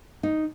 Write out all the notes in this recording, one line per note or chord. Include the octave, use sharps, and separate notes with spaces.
D#4